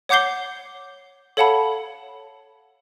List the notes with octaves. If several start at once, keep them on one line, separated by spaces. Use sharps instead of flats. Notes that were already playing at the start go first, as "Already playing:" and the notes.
C#5 F#5 D6 G6 C7 G7
A4 C#5 F5 F#5 A5 B5